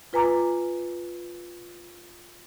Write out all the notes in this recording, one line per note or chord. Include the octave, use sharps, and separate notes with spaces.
F4 B4 G#5 A#5 D6